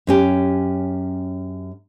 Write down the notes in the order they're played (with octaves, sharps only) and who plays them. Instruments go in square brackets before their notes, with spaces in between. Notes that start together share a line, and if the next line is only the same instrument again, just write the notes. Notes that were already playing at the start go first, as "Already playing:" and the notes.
[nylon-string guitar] F#2 C#4 G4